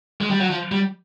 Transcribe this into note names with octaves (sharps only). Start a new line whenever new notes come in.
G#3
G3
F#3
F3
G3